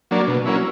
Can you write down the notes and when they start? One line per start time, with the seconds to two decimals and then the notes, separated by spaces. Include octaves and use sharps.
0.11 F#3 A#3 D4
0.28 B2
0.46 F#3 A#3 C#4 E4